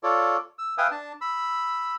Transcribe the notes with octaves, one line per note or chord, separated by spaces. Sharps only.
F4 A4 C#5 D5
E6
B4 E5 F5 G5 G#5 D#6
D4 A5
B5 E6